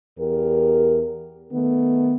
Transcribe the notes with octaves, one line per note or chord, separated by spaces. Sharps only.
E2 G4 A#4
D#3 A3 B3